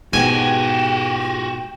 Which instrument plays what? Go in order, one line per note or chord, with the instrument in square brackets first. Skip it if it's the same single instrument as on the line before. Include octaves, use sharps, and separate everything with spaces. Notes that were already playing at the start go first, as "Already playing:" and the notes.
[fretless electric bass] G#2 B2 [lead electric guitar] F#4 G4 [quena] G5 [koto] G#5